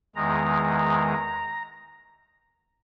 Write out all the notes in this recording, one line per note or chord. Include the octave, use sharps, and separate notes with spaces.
E2 D#3 G#3 A#5